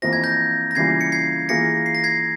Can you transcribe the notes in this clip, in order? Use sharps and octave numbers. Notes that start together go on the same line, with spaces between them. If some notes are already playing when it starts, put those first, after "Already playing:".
F2 E3 A#3 F4 C5 A#6
G#6
G6 A#6
A#6
C#3 E3 G3 A#3 F4 G#6 C7
C#7
G#6 C7
E3 A#3 F4 G#4 A#6 C#7
C7
A#6
G#6 C7